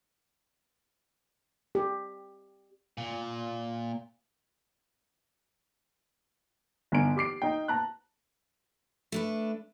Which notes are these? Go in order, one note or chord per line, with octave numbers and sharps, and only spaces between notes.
G4
A#2
G1 D3 G#5 A#5 D7
G4 D6 C7 D7
D#4 G5
A5 A#5 F#6
A3 D4 B4